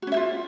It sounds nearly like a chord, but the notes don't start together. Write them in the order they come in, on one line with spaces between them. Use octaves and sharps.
F#4 C#4 E5 F4